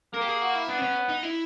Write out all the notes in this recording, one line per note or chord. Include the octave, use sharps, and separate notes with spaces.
A#3 A#4
G4
G#4
F#4
E4
B3 D4
C4
C#4
D#4
E4